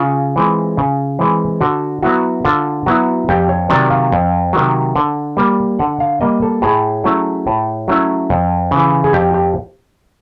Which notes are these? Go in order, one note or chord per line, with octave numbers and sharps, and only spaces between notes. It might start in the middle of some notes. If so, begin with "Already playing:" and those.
Already playing: C#3 F4
E3 G#3 C4
C#3
E3 G#3 C4
D3 F#4
F#3 B3 E4 F#4
D3 F4
F#3 B3 E4 F#4
F2 G4
C#5
C3 D#3 F#3 D5
F5
F2
C3 D#3 F#3
D3
G3 A#3
D3 F#5
F5
G3 A#3 D#5
A4
A2 G#4
F#3 A3 C#4 E4
A2
F#3 A3 C#4 E4
F2
C#3 E3
G#4
F2 G4
G4